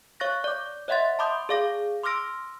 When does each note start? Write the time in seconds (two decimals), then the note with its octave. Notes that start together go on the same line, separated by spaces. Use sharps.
0.20 C#5 F5 C#6 F#6 A6 A#6
0.44 D5 D6
0.88 C#5 D#5 E5 F#5 C6 A6
1.19 A5 B5 C6 D6 D#6 G6
1.49 G#4 D5 F5 D6 A#6
2.03 C6 D6 E6 F6 A#6 D7